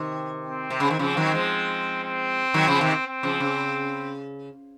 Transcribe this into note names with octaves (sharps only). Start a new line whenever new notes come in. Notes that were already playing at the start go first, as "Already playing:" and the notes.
Already playing: C3 D#3
C4
C3
C#3
D#3
C#3 F3 C4
D#3 F#3
F3 G#3
C4
D#3 F#3
C#3 F3
C3 D#3
C4
C#3 F3
C#3